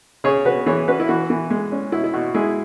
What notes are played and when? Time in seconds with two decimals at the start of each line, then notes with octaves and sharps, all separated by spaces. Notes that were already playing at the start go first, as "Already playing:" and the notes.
0.24 C#3 G#4 C#5
0.45 C#3 F#4 B4
0.66 E3 G#4 C#5
0.88 C#4 F#4 B4
1.00 E4
1.08 E3 F#4
1.30 E3
1.50 G#3
1.72 C#4
1.92 B2 E4
2.04 E4
2.14 B2 F#4
2.34 G#3 E4 G#4